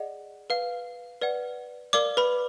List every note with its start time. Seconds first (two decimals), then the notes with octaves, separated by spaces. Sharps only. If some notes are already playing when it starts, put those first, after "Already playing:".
Already playing: G#4 D5 D#5 F#5
0.50 B4 F5
1.21 B4 D5 F#5
1.93 A#4 D5 F5 D6
2.17 B4 B5